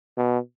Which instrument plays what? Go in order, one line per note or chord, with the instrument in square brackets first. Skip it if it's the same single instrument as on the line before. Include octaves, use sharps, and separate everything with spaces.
[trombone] B2